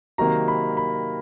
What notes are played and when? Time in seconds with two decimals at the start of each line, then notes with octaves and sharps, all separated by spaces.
0.18 C3 D#3 F#3 A#3 A#5
0.48 B5
0.77 B5